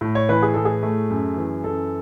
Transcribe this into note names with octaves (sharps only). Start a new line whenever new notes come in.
A2
C#5
E3 B4
G#4
A2 A4
G#4
A3
F#2
E3
F#2 A4